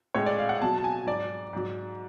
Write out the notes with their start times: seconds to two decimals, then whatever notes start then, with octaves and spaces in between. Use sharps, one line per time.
0.15 A2 G#3 C#5
0.26 D5
0.39 F5
0.49 F#5
0.61 B2 F#3 A5
0.78 A5
0.84 G#5
1.06 G#2 F#3 D5
1.53 G#2 F#3